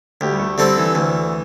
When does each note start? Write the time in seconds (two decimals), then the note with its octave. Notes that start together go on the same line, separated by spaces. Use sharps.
0.21 D2 G4
0.32 G3
0.39 A3
0.58 D3 G3 C4 A4
0.77 E3
0.95 D2